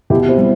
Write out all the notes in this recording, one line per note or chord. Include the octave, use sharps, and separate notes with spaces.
B2 E4 G4
C4 E4
G3